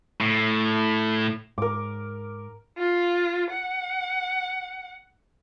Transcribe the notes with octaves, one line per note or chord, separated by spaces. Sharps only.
A2
G#2 A#4 D6
F4
F#5